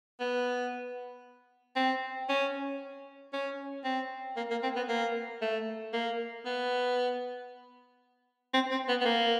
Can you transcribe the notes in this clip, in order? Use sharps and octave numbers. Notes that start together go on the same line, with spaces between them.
B3
C4
C#4
C#4
C4
A#3
A#3
C4
B3
A#3
A3
A#3
B3
C4
C4
B3
B3
A#3